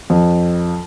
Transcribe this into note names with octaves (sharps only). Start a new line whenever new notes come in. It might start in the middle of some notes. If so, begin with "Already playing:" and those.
F2